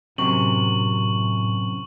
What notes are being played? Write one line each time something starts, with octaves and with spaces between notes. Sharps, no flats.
F#2 A2 C3 C#6 F#7